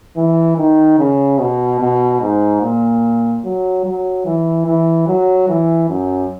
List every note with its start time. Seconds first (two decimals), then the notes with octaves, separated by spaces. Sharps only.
0.17 E3
0.57 D#3
0.99 C#3
1.39 B2
1.80 B2
2.21 G#2
2.62 A#2
3.44 F#3
3.85 F#3
4.26 E3
4.67 E3
5.08 F#3
5.49 E3
5.89 F#2